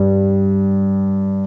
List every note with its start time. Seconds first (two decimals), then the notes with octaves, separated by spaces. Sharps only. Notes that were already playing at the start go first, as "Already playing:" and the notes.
Already playing: G2 G3